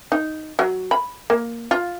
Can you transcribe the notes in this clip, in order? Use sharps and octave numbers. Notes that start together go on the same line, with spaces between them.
D#4
F#3
B5
A#3
F4